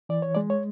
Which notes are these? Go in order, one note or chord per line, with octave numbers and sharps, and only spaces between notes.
E3 D5
C#5
G#3 D5
C#5